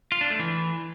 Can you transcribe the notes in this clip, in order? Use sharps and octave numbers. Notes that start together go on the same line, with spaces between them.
F4
D4
A3
E3